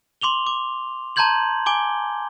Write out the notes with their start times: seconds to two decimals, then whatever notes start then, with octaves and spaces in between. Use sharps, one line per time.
0.21 C6 D6 F7 G7
0.47 D6
1.16 A5 A#5 C6 G6 G#6 F#7
1.66 G#5 D6 G7